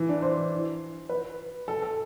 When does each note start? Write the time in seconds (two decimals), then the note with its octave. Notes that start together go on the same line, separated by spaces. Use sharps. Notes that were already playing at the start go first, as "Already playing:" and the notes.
Already playing: E3
0.09 D4
0.22 C5
1.09 B4
1.68 A4
1.82 A4